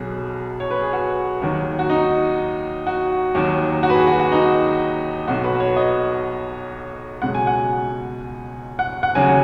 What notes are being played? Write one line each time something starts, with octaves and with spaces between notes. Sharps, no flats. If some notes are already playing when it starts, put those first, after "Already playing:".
Already playing: B1 B2 F#3 G#4
C#5
B4
G#4
F#4
D#2 D#3 F#3
F#4
D#4
F#4
D#2 D#3 F#3
F#4
B4
G#4
F#4
F#4
D#4
B1 B2 F#3 F#4
B4
C#5
D#5
C#2 B2 F#3 F#5
G#5
F#5
F#5
F#5
D#2 C#3 F#3 G#5